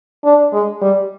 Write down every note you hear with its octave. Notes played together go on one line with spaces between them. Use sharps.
D4
G#3
G3